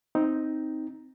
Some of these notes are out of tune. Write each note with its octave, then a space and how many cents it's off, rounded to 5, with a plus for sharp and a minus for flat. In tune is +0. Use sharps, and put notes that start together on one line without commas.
C4 +0 D#4 +5